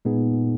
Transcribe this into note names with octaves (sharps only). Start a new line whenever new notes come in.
A#2 G#3 B3 D#4 G#4